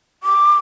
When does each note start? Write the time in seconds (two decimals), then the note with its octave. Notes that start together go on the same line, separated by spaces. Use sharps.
0.23 D6